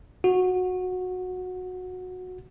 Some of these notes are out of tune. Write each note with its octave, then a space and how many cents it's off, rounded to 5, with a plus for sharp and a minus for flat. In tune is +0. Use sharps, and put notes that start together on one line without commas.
F#4 -15